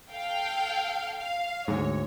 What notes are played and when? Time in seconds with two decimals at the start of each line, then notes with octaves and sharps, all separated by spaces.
0.10 A4 F5 G5
1.17 F5
1.68 D2 G#2 C#5